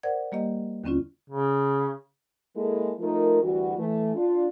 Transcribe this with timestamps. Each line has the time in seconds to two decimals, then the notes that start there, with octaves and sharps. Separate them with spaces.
0.03 A#4 C5 D5 F#5 G#6
0.32 G3 A#3 G4 D#5
0.84 D#2 D3 C4 C#4 E4 F4
1.30 C#3
2.56 G#3 A#3 E4 G#4 A4
2.99 F3 A3 D#4 F4 A#4
3.42 D2 E3 G3 F#4
3.78 E3 A3
4.15 D4 F4